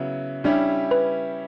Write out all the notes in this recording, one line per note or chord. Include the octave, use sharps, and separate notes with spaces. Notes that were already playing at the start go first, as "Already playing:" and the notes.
Already playing: C#3 F#3 B3 E4
G3 C#4 D4 E4 G4
B4